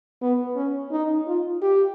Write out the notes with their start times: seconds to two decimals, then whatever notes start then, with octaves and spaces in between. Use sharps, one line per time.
0.21 B3
0.56 C#4
0.91 D#4
1.27 F4
1.61 G4